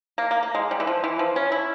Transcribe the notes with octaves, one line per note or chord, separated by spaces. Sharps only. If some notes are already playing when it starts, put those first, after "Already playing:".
A#3
A#3
A#3
G#3
G3
E3
F3
E3
F3
C#4
E4